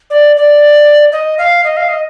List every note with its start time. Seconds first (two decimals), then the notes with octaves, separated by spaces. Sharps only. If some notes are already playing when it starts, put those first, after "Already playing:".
0.10 D5
0.37 D5
1.12 D#5
1.38 F5
1.64 D#5
1.77 F5
1.89 D#5